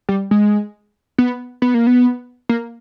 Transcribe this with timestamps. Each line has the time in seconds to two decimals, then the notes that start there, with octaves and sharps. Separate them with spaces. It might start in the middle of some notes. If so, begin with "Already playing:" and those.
0.09 G3
0.31 G#3
1.18 B3
1.62 B3
1.74 A#3
1.87 B3
2.49 A#3